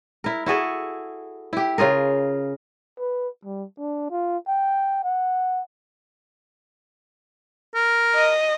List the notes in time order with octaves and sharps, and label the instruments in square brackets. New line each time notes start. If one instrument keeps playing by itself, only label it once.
[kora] E4 A#4
E4 F#4 G#4 A4
E4 G4
C#3 F4 G#4 A#4
[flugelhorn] B4
G3
D4
F4
G5
F#5
[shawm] A#4
[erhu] D#5